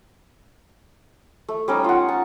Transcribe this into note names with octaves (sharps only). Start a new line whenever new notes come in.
A3
G3 C#4 D#4
F4 F#5
A5